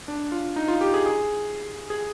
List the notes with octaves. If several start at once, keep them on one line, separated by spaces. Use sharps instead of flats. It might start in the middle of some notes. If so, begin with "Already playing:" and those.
D4
F4
D#4
F4
G4
G#4
G#4
G#4